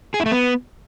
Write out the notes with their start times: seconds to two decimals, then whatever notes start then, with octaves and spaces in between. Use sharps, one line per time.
0.14 G#4
0.20 E4
0.26 A3
0.32 B3